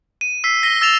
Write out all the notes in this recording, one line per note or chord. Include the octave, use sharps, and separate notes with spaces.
D#7
E6 B6 C7
A#6 B6 D#7 G7
E6 A6 E7 F7